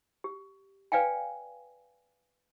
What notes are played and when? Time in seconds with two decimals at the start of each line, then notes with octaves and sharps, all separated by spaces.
0.24 G4
0.92 B4 D5 F5 G5 G#5